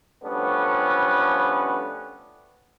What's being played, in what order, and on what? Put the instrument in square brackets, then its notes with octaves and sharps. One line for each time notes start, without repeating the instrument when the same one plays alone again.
[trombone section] F3 G3 A3 B3 C#4 D4